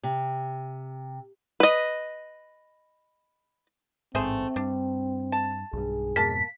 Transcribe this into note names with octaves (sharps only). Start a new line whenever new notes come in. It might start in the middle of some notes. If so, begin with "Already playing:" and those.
C3
B4 D#5
A1 G#2 A3 C4 G#4 C5
G2 D4
A5
B1 G2 G#4
F2 G#2 B2 A#3 A5 B6